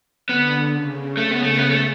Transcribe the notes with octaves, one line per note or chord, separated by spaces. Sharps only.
D3 B3
C#3
C#3 A3
B3
A3
B3
A3